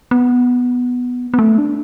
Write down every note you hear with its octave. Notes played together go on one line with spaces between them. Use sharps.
B3
B3
A3
D4